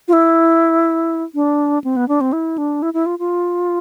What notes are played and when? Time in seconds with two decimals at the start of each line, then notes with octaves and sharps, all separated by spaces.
0.08 F4
0.13 E4
1.35 D4
1.84 C4
1.96 B3
2.08 D4
2.21 C4
2.33 E4
2.58 D4
2.82 E4
2.94 E4
3.06 F4
3.19 F4